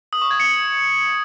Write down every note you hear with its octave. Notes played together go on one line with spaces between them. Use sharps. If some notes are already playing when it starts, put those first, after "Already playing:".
D#6
C#6
G#6
C#7